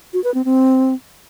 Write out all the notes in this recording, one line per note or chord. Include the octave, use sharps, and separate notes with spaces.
F#4
B4
C4
C4